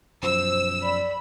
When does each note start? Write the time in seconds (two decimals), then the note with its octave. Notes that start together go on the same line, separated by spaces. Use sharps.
0.23 B1 F#2 F3 C5 E6
0.82 D5 B5